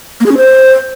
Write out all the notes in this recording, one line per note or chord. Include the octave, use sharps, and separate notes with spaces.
A#3
G#4
C#4
C5